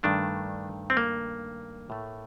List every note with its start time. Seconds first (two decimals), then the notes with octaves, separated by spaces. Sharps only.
0.03 G2 D#3 A3 D4
0.90 C4
0.97 A#3
1.90 A2 A3